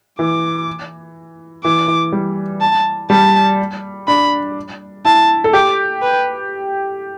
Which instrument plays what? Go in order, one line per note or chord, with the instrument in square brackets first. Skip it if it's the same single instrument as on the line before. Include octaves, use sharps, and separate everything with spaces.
[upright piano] E3 [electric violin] D6
[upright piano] E3 [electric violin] D6
[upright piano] E3
G3
[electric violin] A5
[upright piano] G3 [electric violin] A5
[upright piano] D4 [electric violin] B5
[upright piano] E4 [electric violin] A5
[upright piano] A4
[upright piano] G4 [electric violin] D6
[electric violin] B4